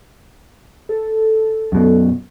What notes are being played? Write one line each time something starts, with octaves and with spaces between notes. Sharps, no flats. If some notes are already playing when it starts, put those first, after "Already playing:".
A4
F#2 B2